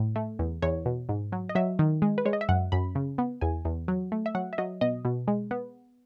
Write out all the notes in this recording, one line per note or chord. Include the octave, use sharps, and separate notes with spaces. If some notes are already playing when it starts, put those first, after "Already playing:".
Already playing: A2
A3
E2
E2 C#5
B2
G#2
F#3
D#5
F#3 E5
D#3
G#3
B4
G#3 C#5
D#5
E5
F#2 F#5
F#2 B5
C#3
B3
E2 G#5
E2
F#3
A3
E5
F#3 F#5
E5
F#3 D#5
B2 D#5
B2
G#3
B3